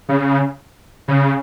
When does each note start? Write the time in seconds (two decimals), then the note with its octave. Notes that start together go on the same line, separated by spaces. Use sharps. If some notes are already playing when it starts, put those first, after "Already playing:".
0.09 C#3
1.08 C#3